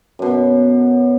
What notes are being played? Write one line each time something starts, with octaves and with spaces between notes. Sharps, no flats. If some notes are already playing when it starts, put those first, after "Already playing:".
F#2 B2